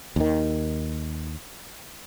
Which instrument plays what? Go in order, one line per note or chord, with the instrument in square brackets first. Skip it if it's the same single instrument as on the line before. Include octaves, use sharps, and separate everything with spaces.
[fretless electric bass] D#2 D#3